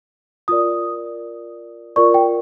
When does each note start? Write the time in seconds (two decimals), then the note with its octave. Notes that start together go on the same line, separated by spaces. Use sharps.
0.48 F4 A#4 D5 D#6
1.96 F4 A#4 D5 C#6
2.14 G5